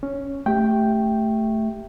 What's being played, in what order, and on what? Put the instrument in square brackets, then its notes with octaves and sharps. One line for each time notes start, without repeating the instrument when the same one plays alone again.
[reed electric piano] C#4
[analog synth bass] A3 [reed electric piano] G4 G5